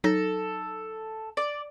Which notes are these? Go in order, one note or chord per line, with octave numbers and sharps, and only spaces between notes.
F#3 D#4 A4 A#6
D5